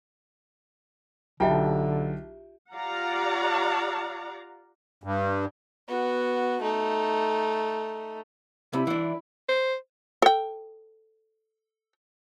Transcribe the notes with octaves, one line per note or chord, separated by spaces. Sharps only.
B1 D3 F4 G4 E5 G5 A5
F4 G4 D5 F5 F#5 A#5
G2
B3 F#4
A3 D#4
C3 E4 B5
E3 D4
C5
A4 G5